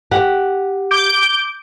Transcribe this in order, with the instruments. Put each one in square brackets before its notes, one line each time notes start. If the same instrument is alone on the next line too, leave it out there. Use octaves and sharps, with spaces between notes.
[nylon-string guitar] G4 F#5
[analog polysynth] D6 G6 D7